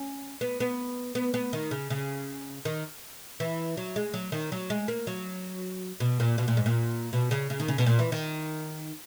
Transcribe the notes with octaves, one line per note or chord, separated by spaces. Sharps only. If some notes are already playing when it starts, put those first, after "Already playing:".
Already playing: C#4
B3
B3
B3
B3
D#3
C#3
C#3
D#3
E3
F#3
G#3
F#3
D#3
F#3
G#3
A#3
F#3
B2
A#2
B2
A#2
G#2
A#2
B2
C#3
C#3
D#3
C#3
B2
A#2
E3
D#3